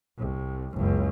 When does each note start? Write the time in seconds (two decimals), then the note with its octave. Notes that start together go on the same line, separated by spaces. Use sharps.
0.18 C2
0.74 F#1 C#2